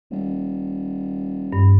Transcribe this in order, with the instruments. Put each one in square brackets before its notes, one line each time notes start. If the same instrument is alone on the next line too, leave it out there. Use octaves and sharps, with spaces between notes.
[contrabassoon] D#1
[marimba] G2